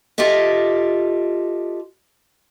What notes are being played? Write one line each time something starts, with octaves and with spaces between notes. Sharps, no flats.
F4 G4 A4 D#5 E5